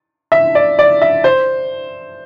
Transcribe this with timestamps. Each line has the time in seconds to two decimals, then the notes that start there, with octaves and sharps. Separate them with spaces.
0.32 E5
0.55 D5
0.79 D5
1.02 E5
1.24 C5